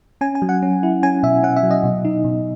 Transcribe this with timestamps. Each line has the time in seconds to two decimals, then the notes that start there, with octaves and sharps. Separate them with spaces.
0.21 C#4 G#5
0.35 G#5
0.42 F#3
0.49 F#5
0.62 C#4
0.83 E4
1.03 C#4 G#5
1.23 B2 E5
1.43 C#4 F#5
1.56 E5
1.63 F#3
1.71 D#5
1.83 B2
2.05 D#4
2.24 B2